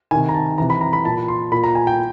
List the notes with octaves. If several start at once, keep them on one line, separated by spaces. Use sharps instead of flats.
C3 D#3 G#5
A#5
A5
C3 E3 A#5
B5
A#5
B5
A#2 A5
C6
A#2 B5
A#5
G#5
G5